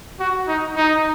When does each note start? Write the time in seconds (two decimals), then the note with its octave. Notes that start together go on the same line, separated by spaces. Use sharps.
0.20 F#4
0.48 D#4
0.76 D#4